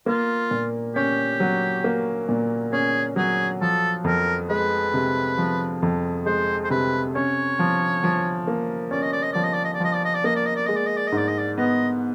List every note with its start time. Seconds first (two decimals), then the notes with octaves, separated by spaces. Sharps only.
0.06 A#3 F4
0.51 A#2
0.95 C#4 G4
1.40 F#3
1.84 A#3
2.29 A#2
2.72 C#4 G#4
3.16 F#3 G#4
3.61 F3 A4
4.04 F2 A#4
4.49 G#3 B4
4.94 C3
5.38 F3
5.83 F2
6.26 G#3 C5
6.64 C5
6.70 C3 B4
7.15 C#4 C#5
7.59 F3
8.04 F3
8.47 A#3
8.91 C#4 D5
9.02 D#5
9.12 D5
9.22 D#5
9.33 F3 D5
9.43 D#5
9.53 D5
9.64 D#5
9.74 D5
9.80 F3 D#5
9.94 D5
10.04 D#5
10.14 D5
10.24 A#3 D#5
10.35 D5
10.46 D#5
10.55 D5
10.66 G#3 D#5
10.76 D5
10.86 D#5
10.97 D5
11.07 D#5
11.12 G#2
11.17 D5
11.27 D#5
11.38 D5
11.57 B3 D#5